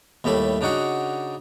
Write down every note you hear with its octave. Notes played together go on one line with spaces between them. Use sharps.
D#2 A2 G3 A3 B5
C#3 D4 D#4 F#4 F#5